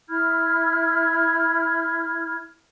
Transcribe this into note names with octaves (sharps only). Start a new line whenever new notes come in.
E4 B5 F6 G#6